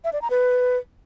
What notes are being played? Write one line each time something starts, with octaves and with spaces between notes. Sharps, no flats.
E5
D5
A#5
B4